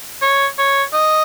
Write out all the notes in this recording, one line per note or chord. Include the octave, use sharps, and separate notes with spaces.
C#5
C#5
D#5